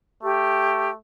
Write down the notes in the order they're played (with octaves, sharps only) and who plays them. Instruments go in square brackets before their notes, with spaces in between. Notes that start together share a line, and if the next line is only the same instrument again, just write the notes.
[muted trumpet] A3 [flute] G4